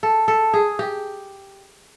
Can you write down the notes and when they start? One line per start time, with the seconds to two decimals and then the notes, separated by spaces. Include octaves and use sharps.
0.03 A4
0.28 A4
0.54 G#4
0.79 G4